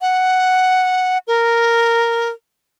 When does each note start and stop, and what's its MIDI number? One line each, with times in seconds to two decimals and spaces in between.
0.01 1.18 78
1.27 2.30 70